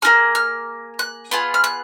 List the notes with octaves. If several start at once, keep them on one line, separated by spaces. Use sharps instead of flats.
A#3 D#4 G#4 F6
F6
F#6
B3 F4 G#4
F6
F#6